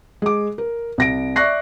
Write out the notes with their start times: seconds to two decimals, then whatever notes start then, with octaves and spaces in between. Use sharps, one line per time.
0.22 G#3 D6
0.58 A#4
0.98 C2 A#6 D7
1.36 D5 E5 C#6 F#6 A#6 C7